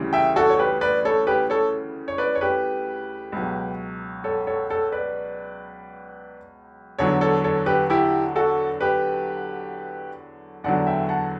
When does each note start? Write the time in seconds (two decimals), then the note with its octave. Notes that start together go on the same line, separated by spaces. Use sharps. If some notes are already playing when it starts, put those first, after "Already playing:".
Already playing: D2 C#3 E3 G3
0.13 E5 G5
0.36 F#4 A4
0.50 C#5
0.59 G4 B4
0.81 B4 D5
1.05 A4 C#5
1.27 G4 B4
1.50 A4 C#5
2.08 C#5
2.18 B4 D5
2.35 C#5
2.41 G4 B4
3.32 C#2 B2 F#3
4.24 A4 C#5
4.47 A4 C#5
4.70 A4 C#5
4.92 B4 D5
6.99 E2 D3 F#3 A4 C#5
7.21 A4 C#5
7.44 A4 C#5
7.66 G4 B4
7.90 E4 G4
8.36 F#4 A4
8.81 G4 B4
10.64 E2 D3 F#3 D5 F#5
10.87 E5 G5
11.09 F#5 A5